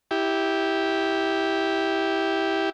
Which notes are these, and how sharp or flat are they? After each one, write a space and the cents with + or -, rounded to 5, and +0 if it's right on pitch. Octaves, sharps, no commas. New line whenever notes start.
E4 -15 G4 +0